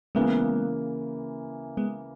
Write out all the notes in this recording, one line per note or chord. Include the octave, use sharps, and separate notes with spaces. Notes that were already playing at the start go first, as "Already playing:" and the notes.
C#3 E3 G#3 A#3 B3
G#3 B3